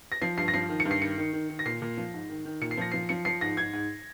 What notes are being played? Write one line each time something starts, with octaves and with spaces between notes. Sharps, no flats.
A#6
F3 C7
G2 C7
A#6
F3 C7
D#3
C#7
G2
C7
D#3 C#7
D#3
D#3
D#3
A#6
A#2 C7
A#2
F3
G#2
D#3
D#3
A#2 C#7
C7
F3 A#6
F3 C7
F3 C#7
F3 C7
G#2 A#6
G#2 G#6
G#2